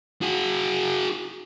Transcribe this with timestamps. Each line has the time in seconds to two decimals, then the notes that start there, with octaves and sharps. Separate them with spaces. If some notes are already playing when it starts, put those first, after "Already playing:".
0.22 F#4 G#4